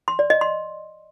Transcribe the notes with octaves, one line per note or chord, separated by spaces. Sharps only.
C6
D5
D#5
C6